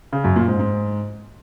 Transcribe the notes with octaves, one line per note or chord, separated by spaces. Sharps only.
C#3
F#2
A#2
G#2
G#2